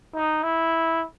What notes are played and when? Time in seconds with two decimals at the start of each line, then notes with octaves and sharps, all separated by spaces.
0.15 D#4
0.43 E4